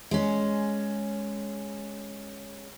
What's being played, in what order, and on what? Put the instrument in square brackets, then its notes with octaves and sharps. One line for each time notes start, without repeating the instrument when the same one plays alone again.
[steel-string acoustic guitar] G#3 C#4